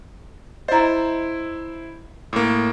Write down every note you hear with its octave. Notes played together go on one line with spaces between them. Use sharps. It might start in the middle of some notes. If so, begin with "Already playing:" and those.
E4 C5 D#5 A#5
A2 A#3 D6